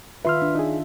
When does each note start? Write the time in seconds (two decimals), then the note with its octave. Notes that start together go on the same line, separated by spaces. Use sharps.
0.25 D#3 F4 B4 E5 C6 F6
0.42 D4
0.55 D#4 G#4